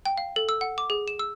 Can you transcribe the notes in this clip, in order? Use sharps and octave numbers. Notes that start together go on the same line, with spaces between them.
G5
F5
A4
E6
F#5
D6
G#4
E7
E6